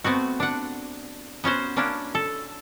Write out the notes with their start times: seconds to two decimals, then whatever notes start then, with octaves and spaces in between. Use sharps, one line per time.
0.04 A3 B3 C4 F#4
0.40 D4 F#5
1.44 B3 C#4 F#4 C5
1.76 A#3 C#4 D4 E4
2.15 A4